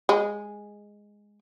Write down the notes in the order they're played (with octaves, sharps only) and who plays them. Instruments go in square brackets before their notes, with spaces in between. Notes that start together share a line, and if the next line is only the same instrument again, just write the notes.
[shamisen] G#3